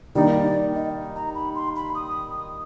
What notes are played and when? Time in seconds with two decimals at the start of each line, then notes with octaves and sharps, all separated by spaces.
0.15 D#3 G3 A#3 D#4 D5
0.75 D#5
1.16 A#5
1.35 B5
1.55 C6
1.76 B5
1.95 D#6